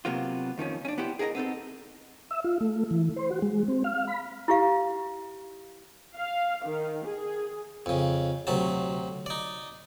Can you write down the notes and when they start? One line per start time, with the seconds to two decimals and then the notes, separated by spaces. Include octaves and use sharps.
0.05 C3 F#3 A#3 B3 F4
0.58 F2 D#3 F3 C#4
0.85 C#4 D4
0.98 B3 E4 G4 C5
1.19 G#4 A#4 D#5 F#5 A#5
1.35 B3 C4 D#4 A4
2.31 E5
2.44 F4
2.61 A3
2.91 E3
3.16 C5
3.30 F#4
3.42 G#3
3.68 C4
3.84 F5
4.07 B5
4.48 E4 G4 F5
6.16 F5
6.65 D#3
7.06 G#4
7.86 F2 C#3
8.47 D2 C3 F#3 A5
9.26 D#4 D5